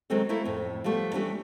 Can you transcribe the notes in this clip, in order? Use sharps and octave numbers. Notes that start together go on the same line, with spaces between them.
D#3 F#3 G#3 C4 C#4 A4
A3 A#3 E4 A4 A#4
F2 A2
F3 G3 A3 B3
E3 G3 A3 C#4 D4